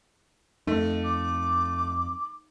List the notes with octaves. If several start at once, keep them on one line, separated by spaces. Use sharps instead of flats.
F2 A3 D#4
D6